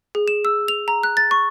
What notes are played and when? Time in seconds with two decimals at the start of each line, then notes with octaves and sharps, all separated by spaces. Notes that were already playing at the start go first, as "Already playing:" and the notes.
0.15 G#4
0.28 E7
0.45 E6
0.68 F7
0.88 A#5
1.03 F#6
1.17 A6
1.31 C#6